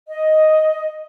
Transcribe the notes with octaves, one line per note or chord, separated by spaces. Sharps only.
D#5